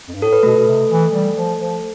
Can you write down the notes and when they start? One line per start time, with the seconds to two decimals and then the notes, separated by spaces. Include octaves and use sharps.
0.08 F2
0.15 G2
0.22 A2 A4
0.33 B4
0.43 B2 A3 A4
0.56 B2
0.68 C3
0.90 E3
1.13 G3
1.36 F3
1.59 F3